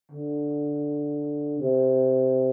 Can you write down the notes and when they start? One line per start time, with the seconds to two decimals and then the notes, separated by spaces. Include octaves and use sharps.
0.12 D3
1.60 C3